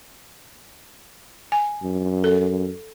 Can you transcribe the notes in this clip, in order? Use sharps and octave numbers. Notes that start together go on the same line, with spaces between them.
G#5
F#2
A4